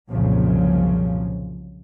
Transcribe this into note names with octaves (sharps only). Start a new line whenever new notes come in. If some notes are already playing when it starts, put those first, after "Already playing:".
C2 F#2 A#2 C#3 F3